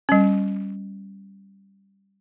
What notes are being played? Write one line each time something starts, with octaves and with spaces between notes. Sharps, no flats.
G3 C#4